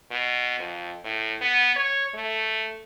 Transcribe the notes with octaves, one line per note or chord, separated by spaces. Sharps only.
B2
F2
A2
B3
C#5
A3